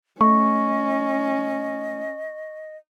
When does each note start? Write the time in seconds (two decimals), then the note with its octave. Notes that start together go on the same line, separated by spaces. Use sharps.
0.21 A3 C#4 D#5 C#6